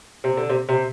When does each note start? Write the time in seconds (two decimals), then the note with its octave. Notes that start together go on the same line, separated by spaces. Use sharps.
0.24 C3
0.37 D3
0.49 C3
0.69 C3